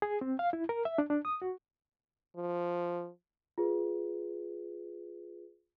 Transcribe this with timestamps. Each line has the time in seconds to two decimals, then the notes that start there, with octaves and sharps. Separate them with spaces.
0.02 G#4
0.21 C4
0.39 F5
0.53 E4
0.69 A#4
0.85 E5
0.98 D4
1.10 D4
1.25 D#6
1.42 F#4
2.36 F3
3.58 F4 G#4 B4